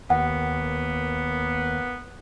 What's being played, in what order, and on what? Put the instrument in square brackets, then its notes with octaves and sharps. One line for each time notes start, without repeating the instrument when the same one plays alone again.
[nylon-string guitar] D#2 [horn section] A#3 B3 [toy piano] F#5